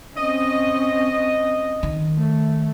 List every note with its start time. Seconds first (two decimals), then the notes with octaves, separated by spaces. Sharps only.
0.16 C4 C#4 D#5
1.83 D#3
2.18 A3